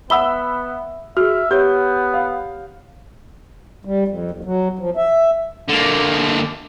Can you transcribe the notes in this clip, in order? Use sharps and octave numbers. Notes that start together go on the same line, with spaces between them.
B3 E5 F#5 B5 E6 G7
F#4 G#4 E5 F6
B3 G4 C#5 G6
F5
G3
F2
D#2
F#3
F3
E5
D3 A#3